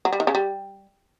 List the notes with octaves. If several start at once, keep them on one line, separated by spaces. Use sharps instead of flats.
F#3
G3
D#3
C#3
G3